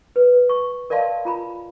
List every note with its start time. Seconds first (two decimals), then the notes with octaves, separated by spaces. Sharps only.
0.16 B4
0.49 C#6
0.90 A#4 D5 D#5 F5 A5 C6
1.25 F4 A#5 B5